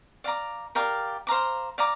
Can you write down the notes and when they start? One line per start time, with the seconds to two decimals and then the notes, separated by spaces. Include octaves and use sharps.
0.24 D5 F5 A#5 D6
0.75 G4 A#4 D5 F5
1.27 C5 F5 A#5 D6
1.78 D5 F5 A#5 D6